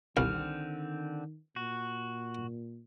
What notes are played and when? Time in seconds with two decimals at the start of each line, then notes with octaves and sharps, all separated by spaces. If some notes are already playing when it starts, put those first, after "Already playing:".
0.17 C2 D3 D#3 C4 F6
1.56 A#2 F#4